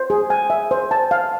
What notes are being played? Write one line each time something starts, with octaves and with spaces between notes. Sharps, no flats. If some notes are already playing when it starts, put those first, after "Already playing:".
Already playing: C5
G#4
G#5
E5
C5
A5
F5